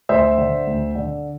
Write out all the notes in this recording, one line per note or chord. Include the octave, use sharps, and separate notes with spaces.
D2 C5 E5
D3
D2
D3